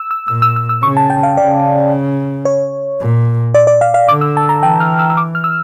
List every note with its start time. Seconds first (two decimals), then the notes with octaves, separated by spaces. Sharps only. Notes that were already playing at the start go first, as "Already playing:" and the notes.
Already playing: E6
0.11 E6
0.28 A#2 E6
0.42 E6
0.56 E6
0.69 E6
0.83 C#3 C#6
0.97 A5
1.10 G5
1.23 F5
1.36 C#3 D5
2.45 C#5
3.00 A#2
3.54 D5
3.67 D5
3.81 F5
3.94 F5
4.08 D3 D6
4.21 E6
4.37 A5
4.49 A#5
4.62 E3 G5
4.80 F6
4.99 E6
5.10 E6
5.17 D6
5.35 F6
5.44 E6